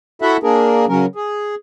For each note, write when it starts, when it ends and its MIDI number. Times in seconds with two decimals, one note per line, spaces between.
0.22 0.37 64
0.22 0.37 66
0.22 0.37 69
0.22 0.37 76
0.22 0.37 78
0.43 0.86 58
0.43 0.86 62
0.43 0.86 68
0.43 0.86 70
0.88 1.06 49
0.88 1.06 54
0.88 1.06 61
0.88 1.06 70
1.15 1.55 68